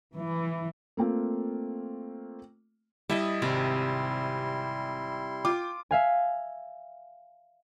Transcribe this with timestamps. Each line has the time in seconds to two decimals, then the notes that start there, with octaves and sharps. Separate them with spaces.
0.15 E3
0.97 A3 A#3 C4 F4
3.09 G3 E4 D#5 E5 A5
3.42 G#1 C3 G3 E4 C6
5.45 F4 G5 D6
5.91 E5 F5 G#5